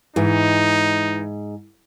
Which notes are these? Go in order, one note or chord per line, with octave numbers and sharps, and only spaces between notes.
G#2 E3 D#4